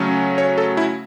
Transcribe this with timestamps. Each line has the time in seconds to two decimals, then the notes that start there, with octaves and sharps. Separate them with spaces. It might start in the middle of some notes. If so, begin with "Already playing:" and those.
Already playing: C#3 F#3 A3 C#4
0.38 C#5
0.58 A4
0.77 E4